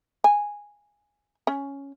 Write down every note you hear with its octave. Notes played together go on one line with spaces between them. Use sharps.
G#5
C#4